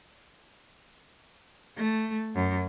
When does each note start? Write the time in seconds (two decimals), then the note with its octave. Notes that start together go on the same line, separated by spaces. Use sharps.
1.77 A3
2.35 F#2